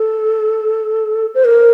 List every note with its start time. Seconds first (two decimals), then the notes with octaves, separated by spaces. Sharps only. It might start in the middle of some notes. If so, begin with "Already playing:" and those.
Already playing: A4
1.35 C5
1.45 A#4